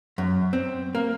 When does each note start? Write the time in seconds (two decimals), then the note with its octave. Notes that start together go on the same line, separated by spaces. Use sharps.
0.18 F#2
0.53 C4
0.95 A#3